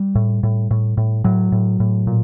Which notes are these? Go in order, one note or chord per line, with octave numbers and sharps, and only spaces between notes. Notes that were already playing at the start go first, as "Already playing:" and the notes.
Already playing: G3
A2
A2
A2
A2
A2 F#3
A2
A2
A#2